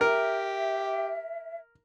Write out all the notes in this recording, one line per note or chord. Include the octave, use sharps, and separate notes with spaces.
G4 A#4 E5